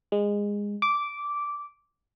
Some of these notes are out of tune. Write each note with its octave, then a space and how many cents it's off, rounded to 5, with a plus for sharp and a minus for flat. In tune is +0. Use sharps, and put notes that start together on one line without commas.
G#3 -20
D6 -10